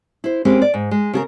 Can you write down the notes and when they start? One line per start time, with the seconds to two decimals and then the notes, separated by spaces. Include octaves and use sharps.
0.24 E4 C5
0.45 G#3 A#3 C4 C#4 G4
0.62 D5
0.74 G#2
0.91 G#3
1.13 C#3 G#4 A#4